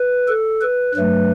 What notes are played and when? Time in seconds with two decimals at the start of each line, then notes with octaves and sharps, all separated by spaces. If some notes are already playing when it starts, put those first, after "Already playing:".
Already playing: B4
0.28 A4
0.61 B4
0.94 G2 F#3 A3 B4